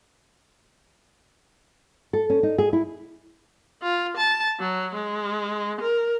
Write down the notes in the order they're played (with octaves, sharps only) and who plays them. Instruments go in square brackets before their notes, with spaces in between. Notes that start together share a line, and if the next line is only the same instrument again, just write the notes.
[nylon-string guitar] A4
C#4
D#4
G#4
E4
[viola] F4
A5
F#3
G#3
A#4